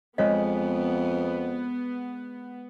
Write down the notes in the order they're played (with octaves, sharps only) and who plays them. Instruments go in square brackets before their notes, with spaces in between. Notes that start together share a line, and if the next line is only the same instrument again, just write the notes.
[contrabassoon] F2 [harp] G#3 B6 [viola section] B3 [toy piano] C#5 D#5